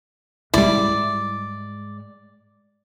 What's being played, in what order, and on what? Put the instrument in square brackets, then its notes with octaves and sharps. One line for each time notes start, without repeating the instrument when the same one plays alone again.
[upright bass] G#2 G#3 [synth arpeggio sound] G3 E4 [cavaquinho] D5